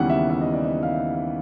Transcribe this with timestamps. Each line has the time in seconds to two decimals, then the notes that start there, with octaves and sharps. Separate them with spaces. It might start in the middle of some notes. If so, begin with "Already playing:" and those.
Already playing: D#2 C#3 E3 G3 B3 F#5
0.10 E5
0.30 E5
0.41 D#5
0.53 D5
0.64 D#5
0.83 F5
0.92 E5
1.13 F5